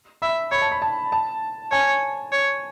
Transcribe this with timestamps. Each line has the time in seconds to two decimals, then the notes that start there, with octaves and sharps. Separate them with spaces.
0.22 E5 B5
0.52 C#5 B5
0.62 A5
0.72 B5
0.82 A5
1.12 A5
1.72 C#5 G#5
2.32 C#5